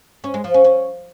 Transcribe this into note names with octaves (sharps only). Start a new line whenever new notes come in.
C#4
G#3
F3
C#4
C#4